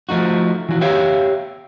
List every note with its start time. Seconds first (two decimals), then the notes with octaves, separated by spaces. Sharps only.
0.09 F3 A3 D#4 F#4
0.69 E3 F#4
0.81 G4 C#5 E5 F5 G5